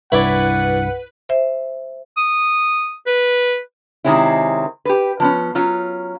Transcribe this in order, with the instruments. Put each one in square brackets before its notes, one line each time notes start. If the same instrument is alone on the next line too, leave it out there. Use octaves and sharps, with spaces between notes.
[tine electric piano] C2 G2 B5 [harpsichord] E4 C#5 D5 [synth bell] B4 [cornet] F#5
[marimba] C5 E5
[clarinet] D#6
B4
[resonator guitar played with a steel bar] C3 D#3 G#3 C4 C#4 E4
G4 B4
F3 B3 C#4
F#3 C#4 F4